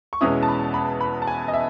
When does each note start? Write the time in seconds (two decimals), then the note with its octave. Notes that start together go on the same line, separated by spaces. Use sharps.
0.13 C#6
0.21 E2 B2 G#3 C#4 E4 D#6
0.43 A5
0.48 B5
0.74 B5
1.01 B5
1.22 A5
1.27 G#5
1.48 D#5
1.53 E5